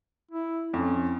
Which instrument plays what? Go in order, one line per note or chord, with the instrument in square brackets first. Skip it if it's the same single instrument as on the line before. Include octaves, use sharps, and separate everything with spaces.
[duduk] E4
[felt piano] F2 [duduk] C#4